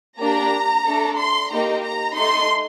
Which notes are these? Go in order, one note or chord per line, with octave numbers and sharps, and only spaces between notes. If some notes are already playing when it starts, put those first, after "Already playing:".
A#3 D4 G4 A#5
A3 D4 A4
C6
A#3 D#4 G4 A#5
A#5
A3 D#4 A4 C6